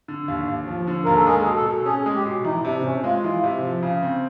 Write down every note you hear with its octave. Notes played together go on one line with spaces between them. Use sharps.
D3
D#2
D#2
F3
D3
D#2 A#4
A4
G#3 G#4
B2
A4
B2
C#4 G#4
G#3
G4
B2
E3 D#4
C3 D4
C3 C#4
G#3 F4
E3
C3
F3
C#3
C4